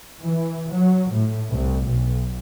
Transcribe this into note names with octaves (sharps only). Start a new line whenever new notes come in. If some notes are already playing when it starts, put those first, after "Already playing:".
E3
F#3
A2
C2
B1